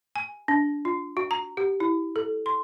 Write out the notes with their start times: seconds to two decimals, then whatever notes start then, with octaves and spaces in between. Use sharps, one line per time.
0.16 G#5
0.48 D4
0.85 F4
1.17 F#4
1.31 A#5
1.57 G4
1.80 E4
2.16 A4
2.46 C6